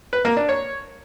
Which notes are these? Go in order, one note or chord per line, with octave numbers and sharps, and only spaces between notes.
B4
A#3
D4
C#5